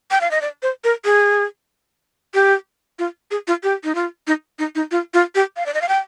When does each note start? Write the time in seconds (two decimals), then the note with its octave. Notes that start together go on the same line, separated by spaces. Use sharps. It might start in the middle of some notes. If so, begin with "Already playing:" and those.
0.11 G5
0.21 F5
0.31 D#5
0.42 D5
0.63 C5
0.84 A#4
1.05 G#4
2.34 G4
2.99 F4
3.31 G#4
3.47 F4
3.63 G4
3.84 D#4
3.95 F4
4.27 D#4
4.59 D#4
4.75 D#4
4.91 F4
5.14 F4
5.35 G4
5.57 F5
5.66 D5
5.74 D#5
5.82 F5
5.89 G5